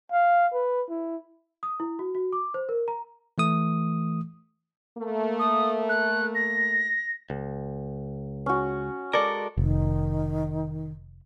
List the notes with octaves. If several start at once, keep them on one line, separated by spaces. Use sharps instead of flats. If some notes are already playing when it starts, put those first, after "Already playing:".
F5
B4
E4
D#6
E4
F#4
F#4
D6
C5
A#4
A#5
E3 A3 D#6
A3 A#3
D#6
F#6
A#6
C#2
C#4 F#4
G#3 A4 A#4 D5
F1 D#3